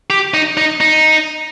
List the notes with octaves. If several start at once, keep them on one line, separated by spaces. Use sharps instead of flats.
G4
D#4
D#4
D#4